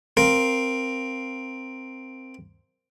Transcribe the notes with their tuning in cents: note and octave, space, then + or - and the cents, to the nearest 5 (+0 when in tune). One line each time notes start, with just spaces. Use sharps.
C4 +0 A#4 +0 F5 +0